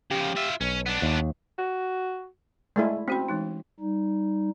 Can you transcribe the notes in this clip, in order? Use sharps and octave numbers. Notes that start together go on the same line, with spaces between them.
C#3 F3 G4
F4 E5
B1 C#4
B3 D4
D#2
F#4
G#3 A3 E4 D5
C4 C#4 F#4 B5
E3 G#3 D#4
G3 D#4